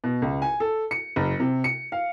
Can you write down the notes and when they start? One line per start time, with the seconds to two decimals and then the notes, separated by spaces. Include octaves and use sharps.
0.04 B2
0.22 C#2
0.42 G#5
0.60 A4
0.91 C#7
1.16 F#1
1.40 C3
1.64 C#7
1.92 F5